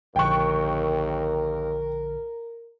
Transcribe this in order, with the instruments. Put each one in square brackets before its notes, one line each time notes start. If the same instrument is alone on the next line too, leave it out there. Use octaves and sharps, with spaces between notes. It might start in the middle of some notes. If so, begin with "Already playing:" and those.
[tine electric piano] A#1 D3 F#6 [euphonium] D#2 [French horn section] A#4 [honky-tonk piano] G5 C#6